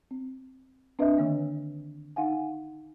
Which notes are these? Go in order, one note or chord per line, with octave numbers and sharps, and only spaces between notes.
C4
C4 D4 B4 D#5 E5
D3 D#3 A#3
D#4 F5 F#5 G#5